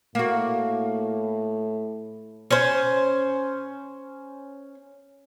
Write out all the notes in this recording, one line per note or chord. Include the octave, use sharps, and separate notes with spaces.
A2 A#3 F#4
C#4 C5